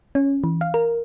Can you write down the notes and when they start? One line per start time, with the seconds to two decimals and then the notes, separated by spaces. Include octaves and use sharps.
0.15 C#4
0.44 E3
0.61 F5
0.74 A#4